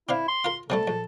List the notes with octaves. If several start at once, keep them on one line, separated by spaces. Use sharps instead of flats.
C4 D4 E4 F5
C6
F4 A#4
C3 G3 A3 A4
A#1